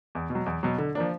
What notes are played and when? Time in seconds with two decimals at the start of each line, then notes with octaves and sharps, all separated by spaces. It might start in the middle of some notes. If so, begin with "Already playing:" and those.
0.15 E2
0.30 B2
0.35 F#3
0.46 E2
0.63 B2 F#3
0.78 D3
0.95 F3 A#3 D4